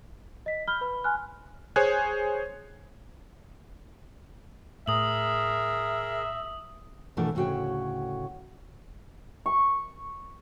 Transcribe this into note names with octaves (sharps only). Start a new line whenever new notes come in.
D#5 B6
B5 F6 G6 G7
B4 B5
G#5 C6 F6 F#6
G#4 C5 C#5 G#5 F#6 G#6
A2 G#4 A#4 E5 D#6 F#7
B2 E3 A3 D4 F4 A#4
D2 A2 C#3 F#4 C#5 G5
C#6